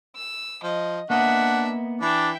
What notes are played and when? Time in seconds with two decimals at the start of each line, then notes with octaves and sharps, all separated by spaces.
0.15 E6
0.63 F3 D#5
1.10 A#3 B3 D4 D#5 E5 F#5
2.02 E3 D4 E5 G5